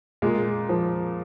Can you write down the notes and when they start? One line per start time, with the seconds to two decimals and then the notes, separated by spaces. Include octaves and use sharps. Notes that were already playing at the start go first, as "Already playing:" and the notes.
0.22 A#2 G#3
0.69 F3